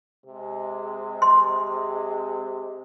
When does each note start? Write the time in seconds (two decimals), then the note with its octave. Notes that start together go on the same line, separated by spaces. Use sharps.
0.25 C3 G#3
1.22 C6